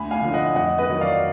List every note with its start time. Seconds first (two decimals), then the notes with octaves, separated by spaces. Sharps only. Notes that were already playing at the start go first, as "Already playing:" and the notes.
Already playing: D2 G#5 B5
0.11 F5 G#5
0.22 D3 F3
0.34 D#5 F#5
0.55 F2 D#5 F#5
0.78 B4 D#5
0.90 D#3 F#3
1.01 D5 F5